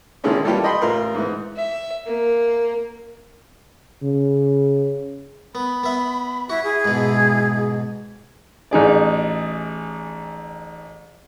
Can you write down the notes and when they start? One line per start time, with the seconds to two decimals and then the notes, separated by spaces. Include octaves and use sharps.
0.24 A#2 D3 D#3 G#3 C#4 E4
0.44 E3 G3 A#3 F4 G4 A4
0.64 D#5 G5 B5 C6
0.81 A1 F4 A#4 C6
1.15 G#2 E3
1.57 E5
2.06 A#3
4.03 C#3
5.55 B3 B5
5.83 B3 E5
6.50 E4 F#4 E5
6.64 E4 G#4
6.85 G#2 B2
8.71 A1 D#4 G#4 D5